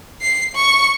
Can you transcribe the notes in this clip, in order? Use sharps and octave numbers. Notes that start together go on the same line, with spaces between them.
C7
C#6